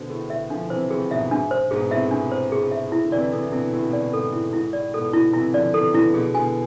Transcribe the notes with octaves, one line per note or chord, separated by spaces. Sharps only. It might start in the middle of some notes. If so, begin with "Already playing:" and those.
Already playing: B2 D3 C5
A2 G#4
A2 E5
D3 F3 D4
C3 E3 C5
A2 C3 G#4
G#2 B2 E5
G#2 D4
C5
G#2 B2 G#4
A2 C3 E5
D4
C5
G#4
E5
E4
D3
C3 E3 D5
C3 E3 A4
C3
B2 D3 E4
A2 C3 E4
B2
A2 D5
G#2 A4
G#2 E4
G#2 E4
A2 D5
G#2 B2 A4
B2 D3 E4
C3 E3 E4
D3 F3 D5
C3 E3 A4
B2 D3 E4
B2 D3 G#4
B2 D3 G#5